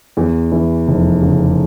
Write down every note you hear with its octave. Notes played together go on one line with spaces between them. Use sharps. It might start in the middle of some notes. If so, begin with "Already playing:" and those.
E2
E3
F1
C#3